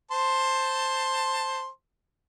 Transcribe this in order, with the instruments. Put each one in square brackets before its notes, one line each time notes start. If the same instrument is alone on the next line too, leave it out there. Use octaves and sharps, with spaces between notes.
[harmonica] C5 A5 C6